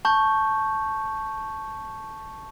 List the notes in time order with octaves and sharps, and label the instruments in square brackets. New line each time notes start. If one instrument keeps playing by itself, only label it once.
[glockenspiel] A5 C#6 G6